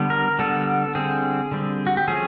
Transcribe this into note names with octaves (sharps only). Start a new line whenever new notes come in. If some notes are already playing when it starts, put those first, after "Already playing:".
Already playing: D3 G3 B3
A#4
D3 G3 B3 A4
D3 G3 C4 G#4
D3 G3 C4
F#4
G4
F3 A3 C#4 G#4